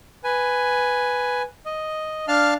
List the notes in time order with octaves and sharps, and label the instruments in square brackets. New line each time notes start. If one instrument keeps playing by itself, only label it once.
[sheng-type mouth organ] B4 G#5
D#5
D4 F5 A5 F6